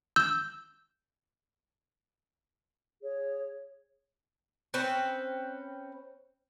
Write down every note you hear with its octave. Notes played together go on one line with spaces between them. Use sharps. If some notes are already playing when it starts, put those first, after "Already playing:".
E6 G6
G#4 C#5
C4 C#4 B4